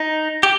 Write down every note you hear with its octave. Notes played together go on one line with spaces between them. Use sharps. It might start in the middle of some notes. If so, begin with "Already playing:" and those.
Already playing: D#4
G4